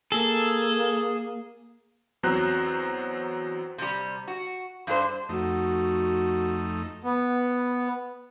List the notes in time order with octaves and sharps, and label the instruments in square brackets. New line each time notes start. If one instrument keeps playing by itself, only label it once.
[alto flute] A#3 [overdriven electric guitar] G#4 [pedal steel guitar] A4
[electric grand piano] E2 F#3 C4 C5 A#5 F#6
[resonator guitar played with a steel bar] C3 G3
F#4
G2 D4 G4 C5
[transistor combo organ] F2 A3 D#4 [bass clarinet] F#4
[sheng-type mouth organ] B3